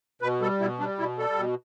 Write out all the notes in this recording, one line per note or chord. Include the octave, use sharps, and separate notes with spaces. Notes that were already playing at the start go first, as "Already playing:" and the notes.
B2 B4
G3 A4
B2 E4
G3 D4
B2 E4
G3 A4
B2